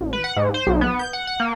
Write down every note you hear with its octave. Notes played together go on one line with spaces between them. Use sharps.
A1
B4
F#5
G#2
C5
B1
B3
G6
F#5
F#5
A#3